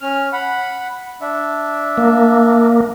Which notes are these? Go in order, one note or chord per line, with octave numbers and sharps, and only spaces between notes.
C#4 F6
F#5 B5
D4 E5
A#3